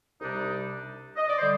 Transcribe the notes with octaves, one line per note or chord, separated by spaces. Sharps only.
C2 C3 G3 D4 D#4
D#5
D5
D3 G3 C5